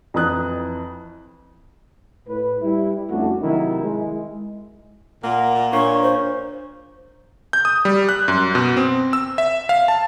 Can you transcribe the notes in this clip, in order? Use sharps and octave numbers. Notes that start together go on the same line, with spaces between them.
F2 E3 A#5 D#6 F#6
A2 B4
G3 E4
F2 A3 C#4 D4 F#4
C3 D#3 F#3 E4
G#3
A#2 A#3 F#5
A#2
A#2 A#3 D4 C#5 F5 C#6
C5
G6
D#6
G3
F#6
F#2
B2
C4
E6
E5
F5
A5